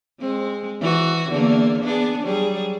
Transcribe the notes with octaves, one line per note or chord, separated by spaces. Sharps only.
G#3 C4
E3 F#4
E2 D3 A#3
B3 D4 G#4
F#3 G3 G#4